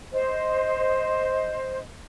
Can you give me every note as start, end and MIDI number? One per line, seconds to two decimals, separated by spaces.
0.13 1.79 72
0.13 1.79 75